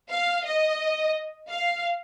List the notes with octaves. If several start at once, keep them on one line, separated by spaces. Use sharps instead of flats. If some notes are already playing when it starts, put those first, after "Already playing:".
F5
D#5
F5